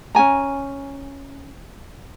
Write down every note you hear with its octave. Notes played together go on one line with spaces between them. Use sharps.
C#4 G4 G#5 A#5